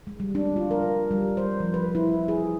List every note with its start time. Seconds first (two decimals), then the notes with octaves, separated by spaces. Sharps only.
0.07 G#3
0.20 G3
0.35 D4
0.56 F4
0.71 A#4
1.11 G3
1.37 C5
1.60 F3
1.74 B4
1.95 E4
2.28 G#4